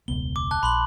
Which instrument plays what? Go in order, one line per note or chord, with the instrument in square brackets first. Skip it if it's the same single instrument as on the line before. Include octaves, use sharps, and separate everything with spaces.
[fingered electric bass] E1 C#2 B3 [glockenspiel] G7
[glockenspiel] D6
A5 F#6
[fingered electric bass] A#1 [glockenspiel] B5 C6 F#7